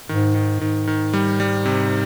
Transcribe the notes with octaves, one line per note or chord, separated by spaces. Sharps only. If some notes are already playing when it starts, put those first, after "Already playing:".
G#2 D#3
D#3
G#2 D#3
D#3
G3
G3
C3